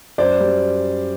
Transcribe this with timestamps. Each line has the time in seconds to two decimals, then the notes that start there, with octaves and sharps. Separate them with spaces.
0.18 F#2 C5 D5
0.40 G3